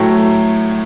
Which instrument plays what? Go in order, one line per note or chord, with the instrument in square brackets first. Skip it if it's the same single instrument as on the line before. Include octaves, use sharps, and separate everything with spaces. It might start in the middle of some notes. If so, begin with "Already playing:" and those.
Already playing: [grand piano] A2 F#3 A3 G5